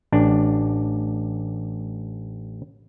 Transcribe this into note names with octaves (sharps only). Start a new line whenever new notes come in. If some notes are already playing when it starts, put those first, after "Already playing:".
A1 D4